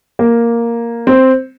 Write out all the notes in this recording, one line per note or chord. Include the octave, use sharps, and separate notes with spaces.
A#3
C4